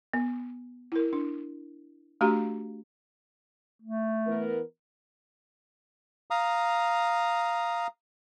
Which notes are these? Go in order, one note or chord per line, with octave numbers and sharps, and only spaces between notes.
B3
E4 A#4
D4
A3 D4 F#4 G4 F5 A#5
A3
E3 B3 A#4
F5 A#5 D#6